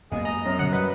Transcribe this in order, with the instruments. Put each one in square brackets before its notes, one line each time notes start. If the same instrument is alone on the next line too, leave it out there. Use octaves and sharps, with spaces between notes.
[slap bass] F#2 A#3 B3 [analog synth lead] G#3 [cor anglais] G#4
[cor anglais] D#5 [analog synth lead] A#5
[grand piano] F#2
[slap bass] B2 D3 D#3 [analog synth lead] F#5
[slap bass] F#3 G3 [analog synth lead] B4 [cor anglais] D#5